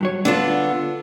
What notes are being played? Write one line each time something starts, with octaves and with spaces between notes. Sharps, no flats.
G2 F#3 C#5
D3 B3 D4 F4 A4